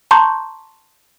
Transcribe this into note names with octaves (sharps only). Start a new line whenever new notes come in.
A5 A#5 C6 C#6 G6